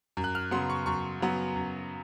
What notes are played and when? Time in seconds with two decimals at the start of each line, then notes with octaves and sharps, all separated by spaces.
0.17 F#2
0.24 F#6
0.35 F6
0.51 C#3 F#3 B3 C6
0.70 C#6
0.86 F#2 C#6
1.20 C#3 F#3 B3
1.56 F#2